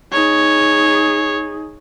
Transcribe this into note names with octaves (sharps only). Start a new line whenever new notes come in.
D#4 G#4 C#5